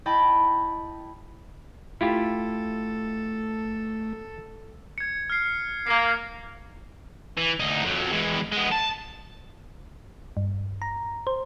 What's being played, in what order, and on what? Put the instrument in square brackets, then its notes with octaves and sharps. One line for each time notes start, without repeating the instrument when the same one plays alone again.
[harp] E4 D#5 G5 A5 B5
[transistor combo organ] A3 [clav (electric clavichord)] E4 F4 G4 [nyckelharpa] A4
[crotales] G#6 C#7
F6 C7
[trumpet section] A#3 [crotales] C7
[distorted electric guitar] E3
D2 D#4
F2 F#3
E3 G#3
G#3 B3
A5
[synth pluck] G2
A#5
C5